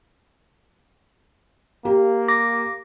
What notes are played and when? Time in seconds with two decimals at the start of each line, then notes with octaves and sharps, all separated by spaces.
1.85 A#3 G4
2.28 D6 A#6